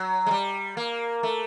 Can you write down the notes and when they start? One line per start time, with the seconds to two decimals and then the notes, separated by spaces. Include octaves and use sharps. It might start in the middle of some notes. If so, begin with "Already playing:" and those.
Already playing: F#3
0.26 G#3
0.31 G3
0.77 A#3
1.23 A3